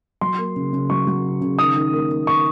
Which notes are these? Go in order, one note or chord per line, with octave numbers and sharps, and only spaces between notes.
F#3 C6
A#3
C#3
C#3
F#3 C#6
F#3
C#3
C#3
D#3 D#6
D#3
A#3
A#3
D#3 C#6